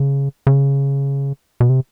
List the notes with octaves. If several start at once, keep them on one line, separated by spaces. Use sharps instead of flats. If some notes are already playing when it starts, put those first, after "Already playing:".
Already playing: C#3
C#3
B2
C3